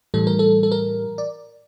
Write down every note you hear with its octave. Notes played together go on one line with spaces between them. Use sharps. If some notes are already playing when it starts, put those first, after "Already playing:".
A2 E3 G3 A4
A#4
A4
A4
A#4
D5